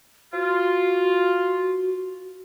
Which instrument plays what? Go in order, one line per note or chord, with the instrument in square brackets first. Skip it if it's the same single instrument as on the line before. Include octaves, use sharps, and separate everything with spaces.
[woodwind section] F4 [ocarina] F#4